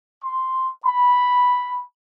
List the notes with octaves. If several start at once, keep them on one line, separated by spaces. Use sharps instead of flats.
C6
B5